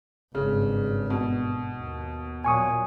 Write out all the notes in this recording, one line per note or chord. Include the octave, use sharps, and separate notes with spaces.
G#1 G2 C#3
B2
D#2
A#2 F#3 G#5 C#6 D#6